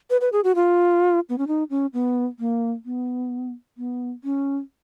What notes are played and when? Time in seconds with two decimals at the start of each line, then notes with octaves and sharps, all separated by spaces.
0.10 B4
0.21 B4
0.33 G#4
0.44 F#4
0.55 F4
1.29 B3
1.38 C#4
1.48 D#4
1.70 C#4
1.94 B3
2.39 A#3
2.86 B3
3.78 B3
4.24 C#4